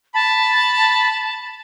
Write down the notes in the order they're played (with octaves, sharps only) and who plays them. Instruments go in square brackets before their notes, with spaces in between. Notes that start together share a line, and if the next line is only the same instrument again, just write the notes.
[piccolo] A5 [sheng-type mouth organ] B5